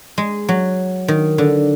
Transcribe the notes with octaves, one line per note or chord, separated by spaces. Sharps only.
G#3
F#3
D#3
D3